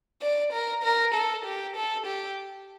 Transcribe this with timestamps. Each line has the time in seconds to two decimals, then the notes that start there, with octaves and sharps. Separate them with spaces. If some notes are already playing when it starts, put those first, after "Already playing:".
0.22 D5
0.52 A#4
0.83 A#4
1.14 A4
1.45 G4
1.76 A4
2.06 G4